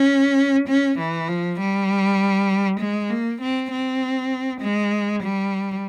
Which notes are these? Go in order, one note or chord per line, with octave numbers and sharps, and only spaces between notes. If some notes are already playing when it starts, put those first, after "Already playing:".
Already playing: C#4
C#4
E3
F3
G3
G#3
A#3
C4
C4
G#3
G3